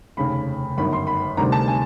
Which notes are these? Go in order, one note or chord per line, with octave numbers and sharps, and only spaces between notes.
F1 D#2 C#3 B5
G1 F#2 D#3 B5
C6
B5
D2 C3 D#3 G3 A#5
A5
G#5